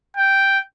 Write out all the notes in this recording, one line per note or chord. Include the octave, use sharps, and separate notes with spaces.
G5